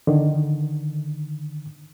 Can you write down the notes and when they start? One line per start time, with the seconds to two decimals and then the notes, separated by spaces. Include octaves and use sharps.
0.07 D3 D#3